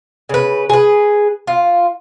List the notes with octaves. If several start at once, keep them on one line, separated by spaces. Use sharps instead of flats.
C#3 B4
G#4 B4
F4